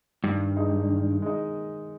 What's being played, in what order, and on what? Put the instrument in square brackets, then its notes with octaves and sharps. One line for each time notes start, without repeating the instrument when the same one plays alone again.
[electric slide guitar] G2 [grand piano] D#3
[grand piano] G#3 D#4
D#3
G#3 D#4